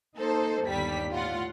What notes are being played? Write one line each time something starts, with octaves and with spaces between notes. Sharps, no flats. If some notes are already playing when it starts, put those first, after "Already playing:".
A#3 D#4 A4 C5
G1 D#2 G3 B6
A2 F4 F#5